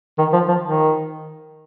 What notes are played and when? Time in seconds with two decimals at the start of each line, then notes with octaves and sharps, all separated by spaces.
0.18 D#3
0.33 F3
0.48 F3
0.64 D#3